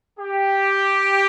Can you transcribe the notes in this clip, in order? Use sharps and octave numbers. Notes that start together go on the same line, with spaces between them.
G4